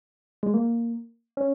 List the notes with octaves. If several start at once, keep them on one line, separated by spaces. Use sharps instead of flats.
G#3
A#3
C#4